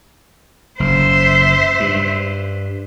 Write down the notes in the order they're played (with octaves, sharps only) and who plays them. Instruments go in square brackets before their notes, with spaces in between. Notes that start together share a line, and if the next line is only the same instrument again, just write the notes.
[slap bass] F#1 [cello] C5 E5
[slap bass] G2